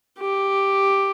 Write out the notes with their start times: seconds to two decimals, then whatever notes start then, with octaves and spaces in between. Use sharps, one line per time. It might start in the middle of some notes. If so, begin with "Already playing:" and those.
0.19 G4